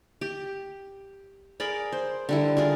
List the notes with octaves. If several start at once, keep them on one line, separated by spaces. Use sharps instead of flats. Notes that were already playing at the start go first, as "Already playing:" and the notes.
G4
G#4 A#4 D5 B5
C5
D3 G3 E4
D4 F4 G#4 A#4